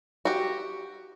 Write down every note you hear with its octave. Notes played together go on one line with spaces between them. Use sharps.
F#4 G4